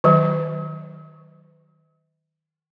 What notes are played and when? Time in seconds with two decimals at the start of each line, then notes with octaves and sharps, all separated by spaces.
0.04 D#3 F#3